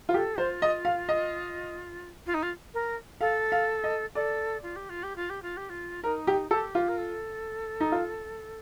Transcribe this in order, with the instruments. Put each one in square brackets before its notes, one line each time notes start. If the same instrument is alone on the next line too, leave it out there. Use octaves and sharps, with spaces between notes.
[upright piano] F4
[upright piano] G4 [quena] A4
[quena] F4 [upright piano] C5
[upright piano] D#5
F5
D#5
[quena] F4
D#4
F4
A#4
[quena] A4 [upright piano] F5
[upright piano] F5
D#5
[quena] A4 [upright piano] D5
[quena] F4
G4
F4
G4
F4
G4
F4
G4
F4
[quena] D#4 [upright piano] A#4
[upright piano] G4
[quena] G4 [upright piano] A4
[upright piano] F4
[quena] A#4
A4
[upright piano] D#4
F4